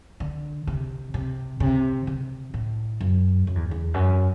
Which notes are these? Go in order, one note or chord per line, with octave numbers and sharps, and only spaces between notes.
D3
C3
C3
C3
C3
A2
F#2
F#2
E2
E2
F#2